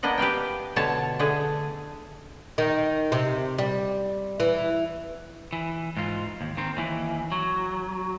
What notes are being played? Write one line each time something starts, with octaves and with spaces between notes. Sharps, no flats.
A#3 B3 D4 D#5 F#5
G4 B4 F5 G5
B2 D3 C#5 A5
D3 A3 G#4
D#3
C3
G3
E3
E3
G#2 F4
D#2
D#3 C4
D#2 E3
F#3